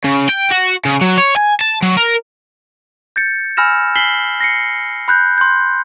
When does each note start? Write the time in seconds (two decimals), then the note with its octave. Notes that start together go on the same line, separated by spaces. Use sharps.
0.04 C#3
0.29 G5
0.51 F#4
0.85 C#3
1.01 F#3
1.18 C#5
1.37 G#5
1.61 A5
1.82 F#3
1.97 A#4
3.16 G6 A6 C#7
3.57 G#5 B5 E6 F6 A#6 E7
3.96 G#5 B6 C7 F#7 G7
4.41 A#6 C7 C#7
5.08 B5 F#6 G6
5.38 C6 G6